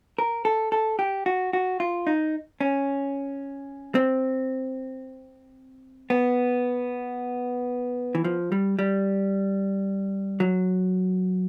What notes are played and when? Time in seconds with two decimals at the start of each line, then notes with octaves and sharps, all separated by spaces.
0.19 A#4
0.45 A4
0.72 A4
0.99 G4
1.26 F#4
1.53 F#4
1.80 F4
2.07 D#4
2.61 C#4
3.95 C4
6.10 B3
8.15 E3
8.24 F3
8.52 G3
8.79 G3
10.40 F#3